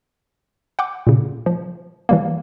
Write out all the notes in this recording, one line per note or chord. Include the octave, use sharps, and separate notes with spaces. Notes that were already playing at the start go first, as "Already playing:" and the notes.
F#5 G5 D6
A#2 C#3
F3
E3 G3 A#3